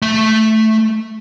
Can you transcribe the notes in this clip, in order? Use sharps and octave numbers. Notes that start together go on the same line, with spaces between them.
A3 E5